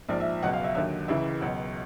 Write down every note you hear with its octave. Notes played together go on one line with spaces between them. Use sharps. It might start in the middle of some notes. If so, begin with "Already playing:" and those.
A#1 G#2 F3 D5
E5
C#2 B2 F#3 F#5
F5
E5
D#2 D3 F#3 E5
C#2 C#3 E3 E5
C#2 B2 F#3